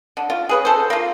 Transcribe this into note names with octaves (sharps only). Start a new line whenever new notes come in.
D3
F4
G#4 B4 C#5
A4 C5
A#3 F4